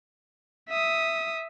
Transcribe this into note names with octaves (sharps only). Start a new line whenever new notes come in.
E5 D#6